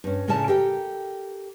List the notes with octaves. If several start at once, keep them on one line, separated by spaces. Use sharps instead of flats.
G2 C#4
A2 C#3 C#4 A#4 D5 A5
G4 A4 A#4 G5